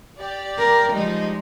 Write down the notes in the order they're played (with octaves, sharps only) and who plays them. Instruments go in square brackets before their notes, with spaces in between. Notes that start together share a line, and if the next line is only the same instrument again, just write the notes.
[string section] G4 D5
[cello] A#4
[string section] F3 G3 D#4 [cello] G#3